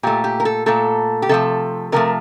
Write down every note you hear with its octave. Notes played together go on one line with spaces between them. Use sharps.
A#2 A3 G4
G4
A#4
A4
A#2 A3 A4
G4
C3 F3 A3 A4
C3 F3 A3 A#4